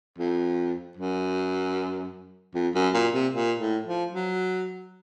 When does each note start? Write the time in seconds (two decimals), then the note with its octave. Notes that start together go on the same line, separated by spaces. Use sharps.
0.18 F2
0.97 F#2
2.54 F2
2.75 F#2
2.94 A#2
3.14 C3
3.34 A#2
3.60 A2
3.86 F3
4.12 F#3